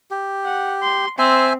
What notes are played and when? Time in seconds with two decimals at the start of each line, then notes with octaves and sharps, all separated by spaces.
0.11 G4
0.44 F#5
0.82 C6
1.19 C4 C5 E5 G#5